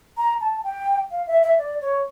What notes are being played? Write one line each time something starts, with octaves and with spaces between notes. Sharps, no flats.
A#5
A5
G5
F5
E5
E5
D5
C#5